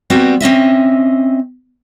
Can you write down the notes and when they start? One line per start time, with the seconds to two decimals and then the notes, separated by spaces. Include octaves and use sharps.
0.10 G3 B3 C4 F#4
0.40 C4 C#4 D#5 E5